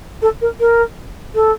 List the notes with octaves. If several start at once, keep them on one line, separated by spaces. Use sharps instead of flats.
A4
A#4
A#4
A4